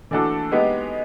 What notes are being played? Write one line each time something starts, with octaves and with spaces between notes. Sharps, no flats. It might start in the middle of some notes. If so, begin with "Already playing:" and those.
E3 A3 D4 F#4 A4
G#3 B3 D#4 G4